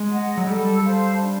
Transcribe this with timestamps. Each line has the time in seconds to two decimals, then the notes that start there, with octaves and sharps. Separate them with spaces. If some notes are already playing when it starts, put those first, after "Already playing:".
Already playing: G#3
0.11 D#5 F#5
0.38 F#3
0.47 G3 A4
0.84 C5 F5 A5
1.20 D4